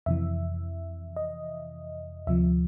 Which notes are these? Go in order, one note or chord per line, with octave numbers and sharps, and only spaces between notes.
F2 C3 E3 E5
D#5
D2 C3 F3 E5